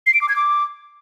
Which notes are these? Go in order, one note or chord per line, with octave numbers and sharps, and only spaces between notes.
C7
D7
D6
G#6
D6